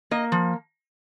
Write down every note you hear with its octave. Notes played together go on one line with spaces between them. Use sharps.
A#3 D#5
F3